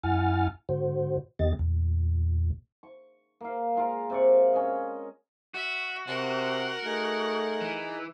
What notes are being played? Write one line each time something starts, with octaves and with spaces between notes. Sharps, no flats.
F#2 E4 F#5 G#5 F6 A6
G#2 D3 F#4 C5
E2 D#3 B3 G4 D#5 A6
E2 A#2
C#6
A#3 F5
G#3 F4 A#4
C3 D5 C#6
C#4 D#5
F#4 E5
C3 A#4 F#5 C6
A3 D#4 G#4
E3